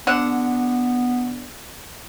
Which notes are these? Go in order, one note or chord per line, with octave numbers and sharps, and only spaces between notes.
D3 B3 F#5